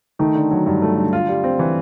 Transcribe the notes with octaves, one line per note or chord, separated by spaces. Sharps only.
D#3 A3
D3
F#3
G2
A3
D3
F4
G3
C4
E3